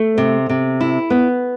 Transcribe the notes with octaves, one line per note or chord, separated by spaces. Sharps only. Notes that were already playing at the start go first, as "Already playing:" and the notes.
Already playing: A3
C3
C3
E4
B3